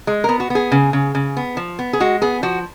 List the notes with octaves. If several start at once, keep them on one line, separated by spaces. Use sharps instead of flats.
G#3
B3 A#4
F#4
B3 G#4
C#3
C#3
C#3
B3
F3
B3
G#4
G#3 F#4
B3 G#4
F3 F#4